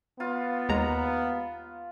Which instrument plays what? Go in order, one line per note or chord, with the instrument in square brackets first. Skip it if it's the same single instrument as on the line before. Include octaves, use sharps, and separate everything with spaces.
[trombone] B3 [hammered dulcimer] F4
[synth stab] D#2 G#3 A#5